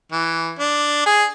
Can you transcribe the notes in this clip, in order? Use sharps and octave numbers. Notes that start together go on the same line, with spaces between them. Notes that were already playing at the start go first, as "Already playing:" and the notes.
E3
D4
G#4